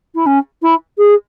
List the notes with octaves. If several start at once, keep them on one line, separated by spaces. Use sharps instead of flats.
E4
C#4
E4
G#4